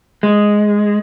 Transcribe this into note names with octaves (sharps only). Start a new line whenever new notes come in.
G#3